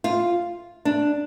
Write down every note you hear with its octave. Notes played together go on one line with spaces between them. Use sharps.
F4
D4